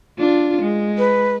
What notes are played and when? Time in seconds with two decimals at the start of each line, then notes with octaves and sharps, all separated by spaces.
0.18 D4 F4
0.61 G#3
0.98 B4